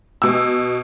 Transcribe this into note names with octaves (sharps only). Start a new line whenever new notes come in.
B2 E6